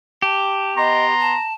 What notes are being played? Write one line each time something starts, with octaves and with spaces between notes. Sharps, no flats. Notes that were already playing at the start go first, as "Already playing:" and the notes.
G4 A5
B3 D#5 A#5 C6
A5